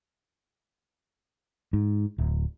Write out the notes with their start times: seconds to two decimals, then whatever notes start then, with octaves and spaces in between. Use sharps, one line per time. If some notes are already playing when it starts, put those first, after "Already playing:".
1.73 G#2
2.18 D1